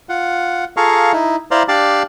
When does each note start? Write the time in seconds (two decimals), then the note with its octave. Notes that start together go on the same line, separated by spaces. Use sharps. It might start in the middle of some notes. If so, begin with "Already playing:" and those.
0.09 F4 F#5
0.77 F4 G#4 A4 F5 A#5 C#6
1.12 D#4 E4
1.51 E4 C5 D5 F5 A#5
1.68 D4 G4 D5 F5 A5